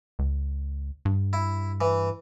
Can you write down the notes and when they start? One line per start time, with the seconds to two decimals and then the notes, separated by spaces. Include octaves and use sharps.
0.19 C#2
1.05 G2
1.33 E4
1.81 E3